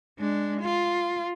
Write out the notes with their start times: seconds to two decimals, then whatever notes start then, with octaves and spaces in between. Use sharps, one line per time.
0.19 G#3 D4
0.61 F4